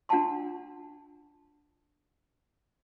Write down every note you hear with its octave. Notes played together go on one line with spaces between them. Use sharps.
D4 F4 F#5 G#5 A5 C6